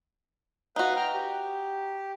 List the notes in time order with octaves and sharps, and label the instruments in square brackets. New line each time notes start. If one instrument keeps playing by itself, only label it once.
[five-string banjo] D#4 F#4 [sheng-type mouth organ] B4 F5
[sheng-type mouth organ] G5 A#5 F6
G4